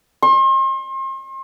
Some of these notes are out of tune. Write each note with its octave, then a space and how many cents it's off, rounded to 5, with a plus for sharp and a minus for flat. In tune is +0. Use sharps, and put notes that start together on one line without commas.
C6 +40